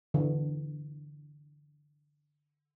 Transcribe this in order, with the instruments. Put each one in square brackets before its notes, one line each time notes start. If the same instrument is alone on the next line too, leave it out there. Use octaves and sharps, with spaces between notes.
[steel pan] D3 E3